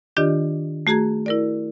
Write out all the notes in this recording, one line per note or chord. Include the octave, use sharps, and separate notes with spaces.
D#3 D4 F4 G4 D5 D#5
A3 F#4 G#4 A#5 G#6
E4 A#4 D5